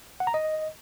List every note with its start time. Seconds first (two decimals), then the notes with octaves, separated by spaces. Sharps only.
0.20 F#5
0.27 A#5
0.34 D#5